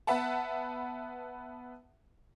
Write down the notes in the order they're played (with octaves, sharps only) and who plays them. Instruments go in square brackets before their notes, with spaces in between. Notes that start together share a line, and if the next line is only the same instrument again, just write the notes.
[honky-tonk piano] B3 B4 E5 F#5 A5